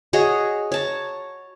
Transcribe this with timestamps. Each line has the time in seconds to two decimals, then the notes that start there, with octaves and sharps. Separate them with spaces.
0.13 F#4 G#4 C#5 D#5
0.72 C#5 A5 A#5